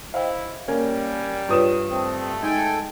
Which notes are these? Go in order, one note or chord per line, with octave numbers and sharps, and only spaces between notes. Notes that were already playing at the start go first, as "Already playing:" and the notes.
E4 C5 D#5 F5 G5
G3 A#3 C#4
G2 F4 B4 C#5 D#6 E7
A3 C4
G#3 D#4 A4 G5 G#5